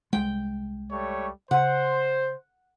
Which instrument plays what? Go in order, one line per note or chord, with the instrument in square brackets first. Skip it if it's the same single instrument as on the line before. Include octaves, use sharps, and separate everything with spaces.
[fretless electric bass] C2 G#3 [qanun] G5
[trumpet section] G3 A3 C#5
[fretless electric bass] C#3 [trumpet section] C5 [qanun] F#5